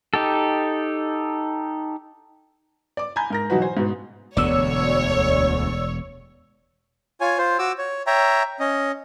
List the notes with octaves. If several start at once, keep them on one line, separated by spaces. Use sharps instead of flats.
D#4 G4 A4
D5 D6
G#5 A#5 B5 G6
G#2 A#4 A#6
B2 E3 F#3 D#4 F#4 B4
C5 G#5
G#2 B2 B3
E1 D2 B3 C#5 D5 E6
F4 C#5 G#5
F4 C5
F#4 D6 E6
C#5
C#5 E5 G5 A#5
C#4 D#5